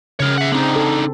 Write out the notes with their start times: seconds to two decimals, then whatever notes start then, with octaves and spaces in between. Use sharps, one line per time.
0.20 C#3 A#4 C#5
0.38 E5 F#5
0.52 D3 C4 D#4
0.76 A4